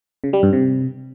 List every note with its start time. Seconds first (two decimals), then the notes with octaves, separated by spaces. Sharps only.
0.24 C#3
0.33 G3
0.43 G2
0.53 C3